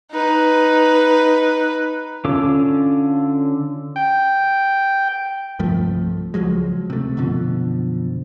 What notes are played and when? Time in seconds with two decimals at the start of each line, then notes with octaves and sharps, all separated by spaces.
0.11 D#4 B4
2.25 D3 C#4 F4 A4 D6
3.96 G5
5.59 C2 G2 F3 A3
6.34 C#2 F3 F#3 G#3
6.90 C3 A3
7.17 F#2 B2 D3 F3